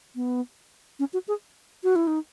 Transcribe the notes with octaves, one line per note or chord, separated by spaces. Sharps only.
B3
C#4
F#4
G#4
F#4
E4
D#4